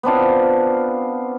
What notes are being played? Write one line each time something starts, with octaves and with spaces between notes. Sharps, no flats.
B3 C4 D4 F4